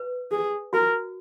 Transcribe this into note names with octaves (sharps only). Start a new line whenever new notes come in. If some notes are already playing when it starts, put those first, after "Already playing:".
Already playing: B4
G#4
F#4 A#4